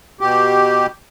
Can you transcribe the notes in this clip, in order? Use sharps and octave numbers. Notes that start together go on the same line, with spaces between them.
B2 G4